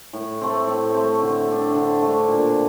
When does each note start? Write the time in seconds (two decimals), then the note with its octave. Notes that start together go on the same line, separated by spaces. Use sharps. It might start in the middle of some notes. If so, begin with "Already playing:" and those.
0.13 A2
0.41 A3 C4
0.67 A2
0.94 A3 C4
1.22 D3
1.48 A3 D4
1.75 D3
2.02 A3 D4
2.28 A#2